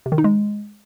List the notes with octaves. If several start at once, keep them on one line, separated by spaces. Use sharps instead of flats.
C3
D#3
D#4
G#3